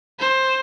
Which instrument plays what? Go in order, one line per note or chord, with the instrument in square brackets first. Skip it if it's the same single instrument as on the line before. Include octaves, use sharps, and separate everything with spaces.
[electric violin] C5